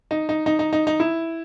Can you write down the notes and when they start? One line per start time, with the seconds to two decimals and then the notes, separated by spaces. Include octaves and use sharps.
0.11 D#4
0.29 D#4
0.46 D#4
0.59 D#4
0.73 D#4
0.87 D#4
1.00 E4